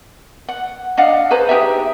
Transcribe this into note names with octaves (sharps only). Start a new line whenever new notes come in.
F#5
D4 D#5 F5 F#5
G#4 B4 C5 A#5
D#4 G4 G#4 E5